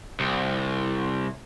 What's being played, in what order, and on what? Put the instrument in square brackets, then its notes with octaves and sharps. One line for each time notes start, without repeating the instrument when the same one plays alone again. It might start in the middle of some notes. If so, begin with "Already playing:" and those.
[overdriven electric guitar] C2